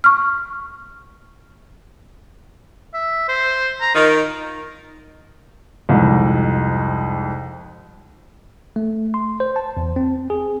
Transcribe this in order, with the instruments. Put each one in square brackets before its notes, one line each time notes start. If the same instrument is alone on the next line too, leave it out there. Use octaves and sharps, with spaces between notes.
[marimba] C#6 F6
[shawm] E5
C5
A#5
[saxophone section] D#3 [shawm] F4
[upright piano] C2 F2 G#2
[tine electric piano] A3
C6
C5
A5
E2
C4
G#4